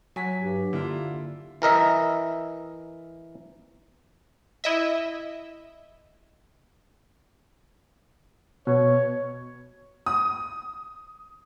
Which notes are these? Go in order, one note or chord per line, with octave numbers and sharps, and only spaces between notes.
F#3 G#5 B6
G2 G4
D3 A#3 E4 F4
E3 A#4 D#5 E5
E4 D#5 E5
B2 C#5
D#6